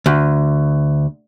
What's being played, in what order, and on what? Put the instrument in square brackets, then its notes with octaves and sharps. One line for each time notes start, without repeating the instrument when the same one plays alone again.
[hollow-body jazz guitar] D2